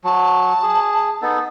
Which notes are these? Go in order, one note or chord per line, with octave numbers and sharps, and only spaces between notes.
F#3 A5
G#4
B3 D#4 A4